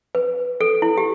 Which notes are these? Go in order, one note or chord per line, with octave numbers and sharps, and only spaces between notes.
B4
A4
E4
G4